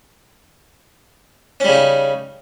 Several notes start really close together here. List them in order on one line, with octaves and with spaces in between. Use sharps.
C#4 G3 C#3 D#4